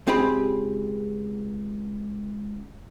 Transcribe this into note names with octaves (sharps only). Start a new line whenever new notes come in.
C#2 C4 G4 G#4 B5